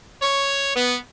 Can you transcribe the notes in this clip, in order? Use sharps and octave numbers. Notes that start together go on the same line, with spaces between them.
C#5
B3